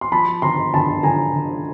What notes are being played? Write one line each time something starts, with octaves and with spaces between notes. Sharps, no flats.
C6
F3 A5 B5
D3 A#5 C6
D3 A5 B5
D3 G#5 A#5
D3